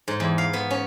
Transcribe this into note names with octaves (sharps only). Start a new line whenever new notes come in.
G#2
E2
F5
B3
C#4